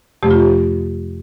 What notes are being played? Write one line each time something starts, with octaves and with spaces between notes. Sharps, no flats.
F2 C3 F3 A3 G4
F4
G4